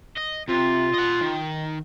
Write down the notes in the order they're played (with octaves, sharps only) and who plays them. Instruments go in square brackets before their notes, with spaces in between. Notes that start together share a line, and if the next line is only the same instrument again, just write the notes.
[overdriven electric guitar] D#5
[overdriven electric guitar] C3 [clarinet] F4
[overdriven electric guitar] D#5 F#5
D#3